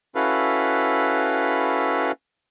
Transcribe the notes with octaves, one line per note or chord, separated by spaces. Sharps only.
C#4 E4 F#4 A4 B4 F5